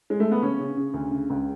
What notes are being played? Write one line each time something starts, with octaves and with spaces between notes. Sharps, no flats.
G#3
A3
B3
C#3 C#4
C#3
C#3
D2
C#3
C#2